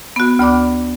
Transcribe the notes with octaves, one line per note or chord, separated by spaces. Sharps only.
B3 F#4
D2 B3 D5 D6